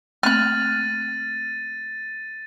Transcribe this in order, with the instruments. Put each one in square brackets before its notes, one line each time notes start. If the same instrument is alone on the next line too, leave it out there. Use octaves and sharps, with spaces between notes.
[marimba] A3 A#3 C4 [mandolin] F6 F#6 [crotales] A6 D#7